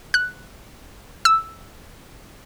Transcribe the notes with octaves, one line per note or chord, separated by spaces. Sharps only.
F#6
E6